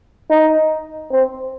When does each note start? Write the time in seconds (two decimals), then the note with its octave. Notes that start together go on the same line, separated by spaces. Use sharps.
0.30 D#4
1.11 C4